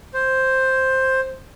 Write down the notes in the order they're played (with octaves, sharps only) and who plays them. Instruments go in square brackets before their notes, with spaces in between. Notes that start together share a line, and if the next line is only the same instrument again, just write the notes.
[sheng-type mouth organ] C5